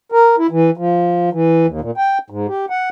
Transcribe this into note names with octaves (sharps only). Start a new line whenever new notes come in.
A#4
E4
E3
F3
E3
D#2
A#2
G5
G#2
G4
F#5